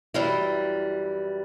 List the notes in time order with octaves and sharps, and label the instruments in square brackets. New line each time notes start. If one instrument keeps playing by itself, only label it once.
[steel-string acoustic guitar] F#2 E3 G3 [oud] E4